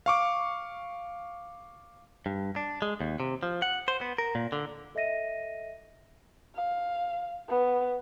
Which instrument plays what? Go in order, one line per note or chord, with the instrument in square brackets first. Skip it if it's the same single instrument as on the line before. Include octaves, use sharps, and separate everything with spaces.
[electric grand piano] F5 C#6 D6
[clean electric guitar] G2
D4
G#3
D#2
C3
F3
F#5
C5
B3
A#4
A#2
D3
[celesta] A4 D#5 E5 A#6 D#7
[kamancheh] F5
B3